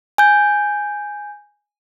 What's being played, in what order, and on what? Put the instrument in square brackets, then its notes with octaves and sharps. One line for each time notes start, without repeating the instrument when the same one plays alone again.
[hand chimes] G#5 G6